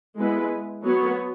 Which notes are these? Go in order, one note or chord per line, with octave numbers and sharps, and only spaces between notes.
G#3 B3 E4 B4
F#3 B3 F#4 C#5